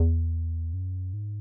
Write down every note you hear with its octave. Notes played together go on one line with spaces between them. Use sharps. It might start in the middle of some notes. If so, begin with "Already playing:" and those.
Already playing: E2
F#2
G#2